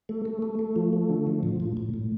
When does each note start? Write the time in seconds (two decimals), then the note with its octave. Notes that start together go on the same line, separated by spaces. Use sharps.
0.09 A3
0.25 A3
0.42 A3
0.59 A3
0.76 F3
0.93 A3
1.10 D3
1.27 F3
1.43 A2
1.60 A2
1.77 A2
1.94 A2